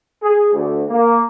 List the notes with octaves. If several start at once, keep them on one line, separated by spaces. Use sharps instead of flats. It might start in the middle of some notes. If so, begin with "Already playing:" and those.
G#4
D2
A#3